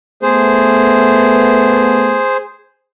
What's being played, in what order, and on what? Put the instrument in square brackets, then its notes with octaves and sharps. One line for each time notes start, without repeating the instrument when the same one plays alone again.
[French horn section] A3 B3 [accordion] G#4 C5